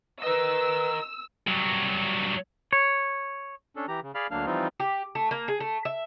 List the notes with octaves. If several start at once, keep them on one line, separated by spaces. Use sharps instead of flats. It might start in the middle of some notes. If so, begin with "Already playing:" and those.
A#4 B4 D#5 E6
G2 F#3
C#5
C#4 D4 A4
E3 G4 A#5
C#3
G#4 D5 F5 B5 F6
D2 F#3 A#3 D4 F5 F6
E3 F3 G3 C4 D#4 F4
G4
A3
A#3
G#4
A3
E5